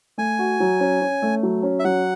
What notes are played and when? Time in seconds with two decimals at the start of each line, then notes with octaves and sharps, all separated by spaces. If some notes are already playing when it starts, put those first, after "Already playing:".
0.18 A3 G#5
0.39 F#4
0.60 F#3
0.80 C#4
1.01 C#4
1.22 A3
1.43 F#3
1.63 C#4
1.79 E5
1.84 F#3 F#5